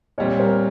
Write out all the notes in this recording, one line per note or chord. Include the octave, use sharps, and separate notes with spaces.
A#2 G3 C4 C#5 D#5
A#4 C5